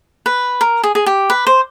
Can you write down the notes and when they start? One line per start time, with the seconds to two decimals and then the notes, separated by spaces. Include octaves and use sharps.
0.26 B4
0.61 A#4
0.83 G#4
0.95 G#4
1.06 G4
1.30 B4
1.47 C5